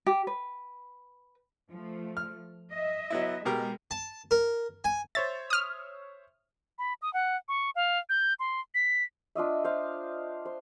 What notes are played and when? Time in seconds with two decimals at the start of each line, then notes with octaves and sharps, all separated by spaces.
0.06 G4
0.27 B4
1.71 F3 A3
2.17 F6
2.72 D#5 E5
3.10 F#3 B3 E4
3.45 B2 G#3 G4 A#4
3.91 A5
4.31 A#4
4.84 G#5
5.15 C5 C#5 E5 A6
5.50 D#6 F6
6.79 B5
7.02 D#6
7.14 F#5
7.48 C#6
7.76 F5
8.09 G6
8.40 C6
8.75 B6
9.35 D4 F4 D#5 E5
9.64 C5 F5
10.45 C5